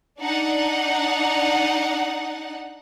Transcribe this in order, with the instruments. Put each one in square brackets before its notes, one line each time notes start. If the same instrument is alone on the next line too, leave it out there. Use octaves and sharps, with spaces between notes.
[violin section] D4 D#4 F#5